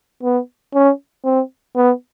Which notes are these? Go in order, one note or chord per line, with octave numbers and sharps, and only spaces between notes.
B3
C#4
C4
B3